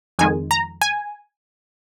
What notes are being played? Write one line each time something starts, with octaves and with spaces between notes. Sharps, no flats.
F2 D#3 G#3 G#5
A#5
G#5